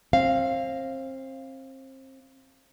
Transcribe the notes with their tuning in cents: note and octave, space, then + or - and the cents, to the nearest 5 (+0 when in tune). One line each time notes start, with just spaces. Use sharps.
C4 +30 F5 -10